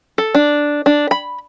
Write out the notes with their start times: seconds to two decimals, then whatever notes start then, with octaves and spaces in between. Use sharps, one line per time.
0.18 A4
0.35 D4
0.86 D4
1.11 B5